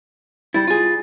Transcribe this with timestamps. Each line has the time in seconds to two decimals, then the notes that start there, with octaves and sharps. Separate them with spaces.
0.54 G3 E4 A6
0.67 F4 G#4